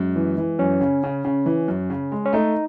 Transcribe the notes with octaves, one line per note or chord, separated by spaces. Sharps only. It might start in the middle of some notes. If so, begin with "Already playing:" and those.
Already playing: F#2 G#3
E3
E3
F#2 C#4
C#3
C#3
C#3
E3
F#2
C#3
G#3
C#4
A3 D#4